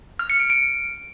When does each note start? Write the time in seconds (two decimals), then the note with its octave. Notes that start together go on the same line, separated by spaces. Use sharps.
0.19 F6
0.30 C#7
0.40 D7
0.50 D7